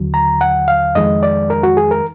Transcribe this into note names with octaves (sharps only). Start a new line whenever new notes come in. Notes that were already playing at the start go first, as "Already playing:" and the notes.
Already playing: D#2 D3 F#3
A#5
F#5
F5
F2 D#3 G#3 D#5
D5
A#4
F#4
G#4
A#4